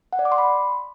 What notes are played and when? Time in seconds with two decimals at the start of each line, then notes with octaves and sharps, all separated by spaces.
0.13 F#5
0.19 D5
0.25 D6
0.32 C6
0.38 B5